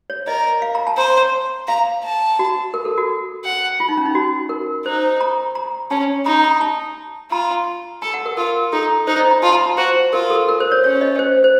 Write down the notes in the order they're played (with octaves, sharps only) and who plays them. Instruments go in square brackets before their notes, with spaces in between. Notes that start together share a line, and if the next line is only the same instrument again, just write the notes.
[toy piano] C#5
[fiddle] A#4 [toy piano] D#5
[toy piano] F5
A#5
A5
[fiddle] C5 [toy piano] A#5
[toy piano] F5 [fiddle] A#5
[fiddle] A5
[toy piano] F#4
A#4
A4
F#4
[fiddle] F#5
[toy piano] F4
D#4
C#4
D#4
F#4
A#4
[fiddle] D#4 [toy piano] C5
[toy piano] A#5
A#5
[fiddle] C#4 [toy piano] A5
[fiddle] D#4 [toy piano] A#5
[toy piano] A#5
A5
[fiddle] F4 [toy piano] A#5
[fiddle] A4 [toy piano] A5
[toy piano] F#5
A#4
[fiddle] F4 [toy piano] A#4
[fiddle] D#4 [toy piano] A4
[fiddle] D#4 [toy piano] C5
[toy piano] D#5
A#5
[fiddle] F4 [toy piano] A5
[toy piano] A#5
A5
[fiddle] F#4 [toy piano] C5
[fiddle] F4 [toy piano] A#4
[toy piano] A4
A#4
C5
C#5
[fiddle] C#4 [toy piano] C#5
[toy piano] D#5
C5
C5